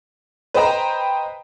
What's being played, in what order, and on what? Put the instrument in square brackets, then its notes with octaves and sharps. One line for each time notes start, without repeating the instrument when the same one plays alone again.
[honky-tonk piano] B4 C5 D#5 G5 A#5